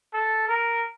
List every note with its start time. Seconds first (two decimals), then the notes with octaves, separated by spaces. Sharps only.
0.13 A4
0.48 A#4